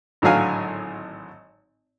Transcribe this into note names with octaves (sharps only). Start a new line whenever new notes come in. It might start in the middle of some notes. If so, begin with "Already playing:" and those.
G#1 A2 D3 F#3 F5 G#5